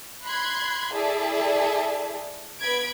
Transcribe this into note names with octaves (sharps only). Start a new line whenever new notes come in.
B5 C6 F#6 G#6
E4 G#4 A4 D5 E5
B3 B5 G#6 D7